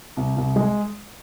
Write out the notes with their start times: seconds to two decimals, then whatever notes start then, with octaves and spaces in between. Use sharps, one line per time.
0.17 C2
0.37 C2
0.56 G#3